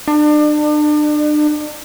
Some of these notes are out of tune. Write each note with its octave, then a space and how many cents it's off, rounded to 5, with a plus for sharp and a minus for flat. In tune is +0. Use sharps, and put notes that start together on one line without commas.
D4 +35